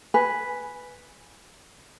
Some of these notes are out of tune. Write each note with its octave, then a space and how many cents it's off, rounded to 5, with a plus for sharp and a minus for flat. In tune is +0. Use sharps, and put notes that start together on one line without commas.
B4 +0 G#5 +0